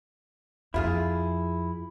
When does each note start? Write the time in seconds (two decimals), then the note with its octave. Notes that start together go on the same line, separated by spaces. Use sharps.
0.74 F2 E4 F4 G#4